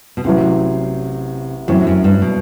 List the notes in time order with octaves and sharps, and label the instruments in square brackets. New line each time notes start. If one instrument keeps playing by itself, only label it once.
[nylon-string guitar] B2
[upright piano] A1 A2 F#3 [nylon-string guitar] C3
[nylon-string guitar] F#2 [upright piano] A2 F#3 C4
[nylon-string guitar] F#2
G2
B2